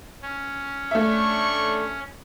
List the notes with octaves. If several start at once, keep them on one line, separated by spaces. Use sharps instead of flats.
C#4
A3 D4 C#5 E5 C#6